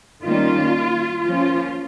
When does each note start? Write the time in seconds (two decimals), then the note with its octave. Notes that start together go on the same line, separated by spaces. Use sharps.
0.24 D#3 G3 A#3 C#4 F4
1.23 F3 A#3 C#4 F4